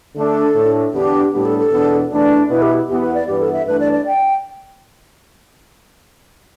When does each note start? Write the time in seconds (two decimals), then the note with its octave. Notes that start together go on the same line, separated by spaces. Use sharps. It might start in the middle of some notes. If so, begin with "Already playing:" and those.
0.15 D3 A3 D4 A4
0.55 A2 A3 D4
0.94 E2 D3 B3 D4 G4
1.33 A2 G3 B3 D4 G4
1.45 A4
1.58 A4
1.72 E2 B2 B3 D4
2.11 E2 E3 A3 D4 D5
2.50 B2 B3 E4 B4
2.62 G4
2.89 E2 E3 B3 G4
3.02 B4
3.15 D5
3.27 G2 E3 B3 G4
3.40 A4
3.53 E5
3.66 G2 E3 A3 D4 B4
3.80 D5
3.92 D5
4.07 G5